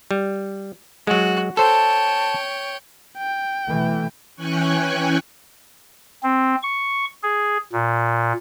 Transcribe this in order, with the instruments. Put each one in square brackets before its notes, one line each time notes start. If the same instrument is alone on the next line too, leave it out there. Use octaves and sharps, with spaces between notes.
[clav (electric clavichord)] G3
[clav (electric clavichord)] F#3 G#3 [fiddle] F#4
[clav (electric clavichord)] A4 C5 [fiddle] C#5 G5 [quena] A5
[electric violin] G5
[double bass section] B2 E3 A3
[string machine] E3 C#4 G5 G#5 C#6 F#6
[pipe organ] C4
C#6
G#4
A#2